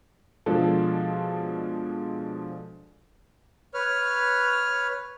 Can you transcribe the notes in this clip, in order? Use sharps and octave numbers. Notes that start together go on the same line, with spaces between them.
B2 F3 G#3 D4 F4 A4
B4 C#5 F6